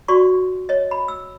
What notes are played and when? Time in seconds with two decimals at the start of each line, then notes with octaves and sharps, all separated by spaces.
0.08 F#4 D5 C6 C#6
0.69 C#5 D#5
0.91 B5
1.08 E6